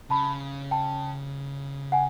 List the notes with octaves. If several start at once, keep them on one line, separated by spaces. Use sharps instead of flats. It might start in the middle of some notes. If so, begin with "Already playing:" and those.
C#3 A5 B5
G5 A5
F#5 G#5